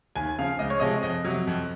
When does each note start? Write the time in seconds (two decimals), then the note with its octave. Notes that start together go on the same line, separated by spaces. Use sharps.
0.16 D#2 G#5
0.38 C#3 F3 F5
0.59 C#2 D#5
0.70 C#5
0.80 C3 F3 G#3 D#5
1.03 F2 D#5
1.24 C3 F#3
1.47 F2